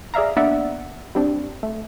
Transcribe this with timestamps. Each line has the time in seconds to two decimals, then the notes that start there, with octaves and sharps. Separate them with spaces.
0.14 G#4 D5 E5 F5 A#5
0.36 A#3 B3 D4 D5 E5 F#5
1.15 G3 C4 D4
1.63 A3